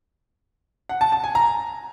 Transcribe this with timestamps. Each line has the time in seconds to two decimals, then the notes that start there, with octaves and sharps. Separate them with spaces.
0.89 F#5
1.01 A5
1.12 A5
1.24 G#5
1.35 A#5